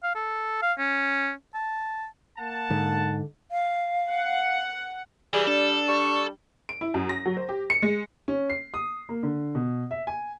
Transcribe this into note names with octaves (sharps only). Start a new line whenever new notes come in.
F5
A4
F5
C#4
A5
A#3 F#5 A5
G#2 D3
F5
F#5
E3 G3 G#4
D4 A4
G3 C#6
D7
E4
F#2
A#6
F#3
C5
G4
C#7
G#3
C#4
C7
D#6
A#3
D3
B2
E5
G#5